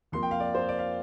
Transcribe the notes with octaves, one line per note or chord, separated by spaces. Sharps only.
F2 F3 A#3 C6
G5
F5
D5
C5
D5
F5